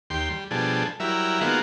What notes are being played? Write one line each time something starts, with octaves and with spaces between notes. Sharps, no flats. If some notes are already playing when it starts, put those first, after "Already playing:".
D#2 G4 C6
G3
B2 F3 G3 D4 G#4 A4
F#3 G3 E4 A#4 E5
D#3 G#3 A#3 B3 F4 F#4